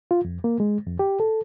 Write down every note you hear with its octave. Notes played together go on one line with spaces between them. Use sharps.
F4
F2
A#3
G#3
F2
G4
A4